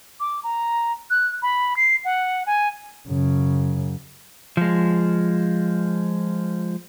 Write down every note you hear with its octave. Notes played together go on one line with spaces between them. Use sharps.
D6
A#5
F#6
B5
C7
F#5
G#5
F#2 C#3
F3 G#3